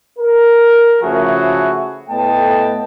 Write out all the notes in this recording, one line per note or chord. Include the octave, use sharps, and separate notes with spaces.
A#4
C#3 F3 A3 E4 F#4 G#4
A2 A3 B3 D#5 G5 A5